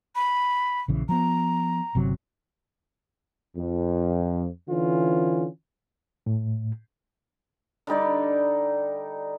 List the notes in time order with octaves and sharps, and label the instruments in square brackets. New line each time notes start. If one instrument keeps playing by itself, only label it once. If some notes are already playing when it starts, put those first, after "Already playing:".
[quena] B5
[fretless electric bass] A#1 C#3 E3
[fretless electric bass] F3 B3 [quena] A#5
[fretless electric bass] G1 C3 F#3
[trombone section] F2
D3 E3 C#4 F4
[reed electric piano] A2
[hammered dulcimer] D3 G3 D#4 D5